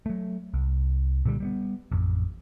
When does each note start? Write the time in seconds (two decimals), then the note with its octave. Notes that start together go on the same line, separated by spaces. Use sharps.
0.06 F#3 A3
0.54 C2
1.25 A#2 D3 F#3 G3
1.40 G3 G#3 B3
1.92 A1 F2